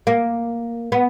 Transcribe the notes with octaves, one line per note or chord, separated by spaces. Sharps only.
A#3
B3